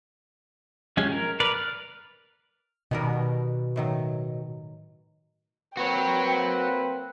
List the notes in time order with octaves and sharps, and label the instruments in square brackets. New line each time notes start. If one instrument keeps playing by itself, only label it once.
[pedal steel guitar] F3 G#3 C#4 G4 G#5
A#4
A#4 B4 D5
F6
[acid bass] B2 [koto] D#3 G3 A#4
[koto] A2 D#3 F#3
[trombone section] A#3 C4 B4 [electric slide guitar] F#4 C#5 [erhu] G5